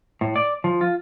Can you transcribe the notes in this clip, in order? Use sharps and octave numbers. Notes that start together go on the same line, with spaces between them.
A2
D5
F3
F4